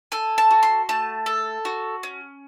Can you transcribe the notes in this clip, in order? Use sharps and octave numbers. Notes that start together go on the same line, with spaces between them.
A4 G#5
A5
F#4
C6
A3 A5
A4
F#4
C#4